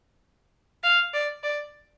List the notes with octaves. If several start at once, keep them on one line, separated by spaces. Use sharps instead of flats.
F5
D5
D5